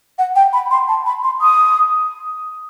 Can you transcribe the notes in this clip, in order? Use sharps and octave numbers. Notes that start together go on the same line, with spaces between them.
F#5
G5
B5
C6
A5
B5
C6
D#6